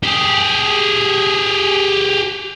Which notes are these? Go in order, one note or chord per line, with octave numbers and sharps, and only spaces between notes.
G4 G#4